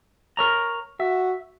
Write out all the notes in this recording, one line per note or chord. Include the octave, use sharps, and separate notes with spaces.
A#4 C#5 A#5
F#4 E5